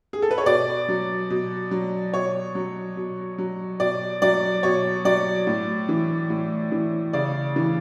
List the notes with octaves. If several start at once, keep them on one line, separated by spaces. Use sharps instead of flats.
G#4
A4
B4
C#5
B2 D5
F#3
B2
F#3
B2 C#5
F#3
B2
F#3
B2 D5
F#3 D5
B2 C#5
F#3 D5
A2
E3
A2
E3
C#3 D5
E3